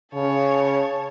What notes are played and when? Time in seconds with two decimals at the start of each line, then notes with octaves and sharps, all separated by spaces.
0.14 C#3 C#5 A5